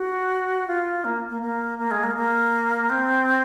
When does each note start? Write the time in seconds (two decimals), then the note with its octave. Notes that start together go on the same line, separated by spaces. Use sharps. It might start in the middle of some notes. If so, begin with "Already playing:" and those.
Already playing: F#4
0.68 F4
1.05 A#3
1.29 A#3
1.42 A#3
1.79 A#3
1.91 G#3
2.03 A#3
2.16 A#3
2.90 C4